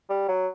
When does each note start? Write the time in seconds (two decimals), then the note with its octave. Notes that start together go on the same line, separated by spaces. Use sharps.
0.10 G3
0.28 F#3